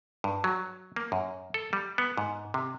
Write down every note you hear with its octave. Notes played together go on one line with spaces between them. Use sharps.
G2
F#3
A#3
F#2
A4
G3
B3
G#2
C3